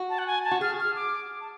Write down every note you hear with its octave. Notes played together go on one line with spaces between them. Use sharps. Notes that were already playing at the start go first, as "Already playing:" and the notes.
Already playing: F#4
A5
F#5
G#5
A5
F#4
G#4 F6
F6
D6
A5